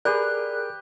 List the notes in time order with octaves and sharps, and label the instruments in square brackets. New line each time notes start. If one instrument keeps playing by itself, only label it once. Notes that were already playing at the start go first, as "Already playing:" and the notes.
[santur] G4 B4 [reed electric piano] G#4 A#4 [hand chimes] D5 [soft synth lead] F#6